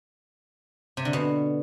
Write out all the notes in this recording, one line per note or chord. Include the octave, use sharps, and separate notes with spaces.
C3
D3
B2